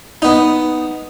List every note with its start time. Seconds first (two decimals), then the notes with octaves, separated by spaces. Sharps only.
0.22 B3 D#4